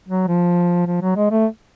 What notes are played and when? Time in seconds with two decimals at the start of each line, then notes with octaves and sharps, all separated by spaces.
0.08 F#3
0.28 F3
0.86 F3
1.01 F#3
1.16 G#3
1.31 A3